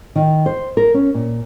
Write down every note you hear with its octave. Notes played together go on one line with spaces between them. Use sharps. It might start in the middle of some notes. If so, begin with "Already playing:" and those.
D#3
C5
A#4
C#4
A#2